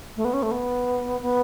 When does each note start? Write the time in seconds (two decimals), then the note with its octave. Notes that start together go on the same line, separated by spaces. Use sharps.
0.17 A3
0.25 B3
0.34 C#4
0.43 A3
0.51 B3
1.22 B3